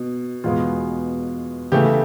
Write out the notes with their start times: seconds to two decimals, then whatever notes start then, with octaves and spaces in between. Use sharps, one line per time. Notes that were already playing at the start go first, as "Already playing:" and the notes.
Already playing: B2
0.44 E2 B2 G#3 B3 F4
1.72 C#3 E3 A3 G4